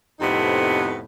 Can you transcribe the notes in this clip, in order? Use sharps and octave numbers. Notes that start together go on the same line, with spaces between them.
F2 A2 C3 B3 D#4